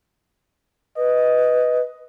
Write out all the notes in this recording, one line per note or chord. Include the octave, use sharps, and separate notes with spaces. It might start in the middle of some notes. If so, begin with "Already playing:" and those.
B4 D#5